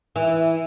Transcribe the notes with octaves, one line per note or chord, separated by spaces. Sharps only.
E3